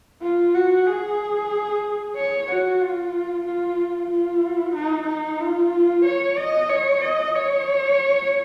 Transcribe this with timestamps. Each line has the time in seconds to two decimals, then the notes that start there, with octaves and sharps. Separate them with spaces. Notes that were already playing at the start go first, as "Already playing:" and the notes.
0.22 F4
0.54 F#4
0.87 G#4
2.17 C#5
2.48 F#4
2.81 F4
3.45 F4
4.10 F4
4.75 D#4
5.08 D#4
5.41 F4
6.05 C#5
6.38 D#5
6.69 C#5
7.02 D#5
7.35 C#5